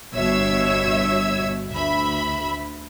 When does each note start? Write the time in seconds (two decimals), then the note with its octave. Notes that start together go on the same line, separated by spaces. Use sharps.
0.13 G1 B2 C#5 E5 E6 G#6
1.70 D2 E5 B5